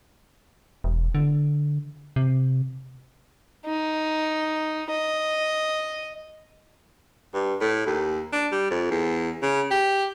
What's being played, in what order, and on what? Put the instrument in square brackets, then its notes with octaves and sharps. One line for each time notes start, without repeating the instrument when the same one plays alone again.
[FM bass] E1
D3
C3
[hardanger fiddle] D#4
D#5
[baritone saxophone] G2
A2
D#2
D4
G3
F2
E2
C#3
G4